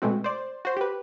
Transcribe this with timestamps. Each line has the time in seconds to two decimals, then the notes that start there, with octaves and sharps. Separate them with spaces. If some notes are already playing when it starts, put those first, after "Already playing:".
0.02 B2 G#3 A3 C4 F#4
0.24 C5 D5
0.65 F#4 C5
0.77 G4 B4